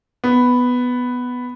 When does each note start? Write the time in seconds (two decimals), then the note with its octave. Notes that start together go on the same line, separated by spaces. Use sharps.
0.24 B3